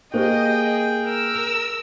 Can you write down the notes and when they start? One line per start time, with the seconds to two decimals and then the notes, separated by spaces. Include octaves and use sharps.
0.14 A#3 G4 G#4 B4 C5 D#5 G5
1.05 A#4 E6